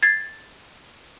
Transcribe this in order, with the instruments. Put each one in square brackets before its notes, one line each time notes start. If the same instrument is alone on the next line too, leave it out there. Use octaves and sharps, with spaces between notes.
[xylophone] G#6 A6 C7